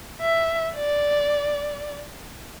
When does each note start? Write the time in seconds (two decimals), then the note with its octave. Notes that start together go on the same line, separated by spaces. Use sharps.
0.21 E5
0.75 D5